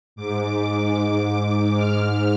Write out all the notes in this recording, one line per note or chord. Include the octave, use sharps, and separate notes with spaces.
G#2 D6
G#2
D6
G#2 F6